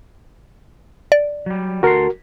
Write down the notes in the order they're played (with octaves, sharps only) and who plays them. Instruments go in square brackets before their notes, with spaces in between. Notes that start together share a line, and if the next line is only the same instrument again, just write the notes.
[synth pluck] D5
[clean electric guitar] F#3 G3
[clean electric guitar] D2 A4 C6 [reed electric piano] F#4 A#4